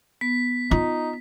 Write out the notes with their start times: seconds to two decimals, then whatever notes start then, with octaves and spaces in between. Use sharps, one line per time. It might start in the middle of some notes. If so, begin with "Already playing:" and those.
0.21 B3 B6
0.71 D#4 F4